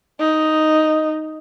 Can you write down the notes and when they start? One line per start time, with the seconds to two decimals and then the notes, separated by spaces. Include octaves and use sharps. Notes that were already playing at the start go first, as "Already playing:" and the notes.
0.19 D#4